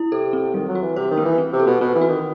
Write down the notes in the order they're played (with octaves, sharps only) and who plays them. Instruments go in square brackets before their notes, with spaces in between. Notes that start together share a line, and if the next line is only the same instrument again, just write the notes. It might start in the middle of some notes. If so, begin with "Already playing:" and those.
Already playing: [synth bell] E4
[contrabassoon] C3 [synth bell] A4
[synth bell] C4
[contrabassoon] D#3 [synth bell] G3
[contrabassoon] F#3
[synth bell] F#4
[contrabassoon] E3
[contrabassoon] C3 [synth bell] C5
[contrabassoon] D#3
[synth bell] B3
[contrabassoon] E3
[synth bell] C4
[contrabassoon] C3
[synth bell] A4
[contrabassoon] B2
[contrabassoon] B2 [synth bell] C4
[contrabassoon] E3
[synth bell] F#4
[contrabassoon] D#3